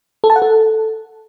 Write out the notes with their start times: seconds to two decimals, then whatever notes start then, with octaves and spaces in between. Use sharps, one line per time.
0.24 A4
0.30 A5
0.36 F#5
0.42 A4